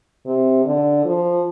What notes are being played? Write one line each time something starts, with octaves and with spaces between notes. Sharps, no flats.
C3
D3
F3